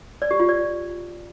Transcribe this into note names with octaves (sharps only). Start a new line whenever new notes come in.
D5
G4
F4
D5